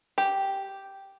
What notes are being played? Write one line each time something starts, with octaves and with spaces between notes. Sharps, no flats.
G4